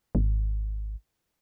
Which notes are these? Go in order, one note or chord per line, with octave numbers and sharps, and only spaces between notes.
G#1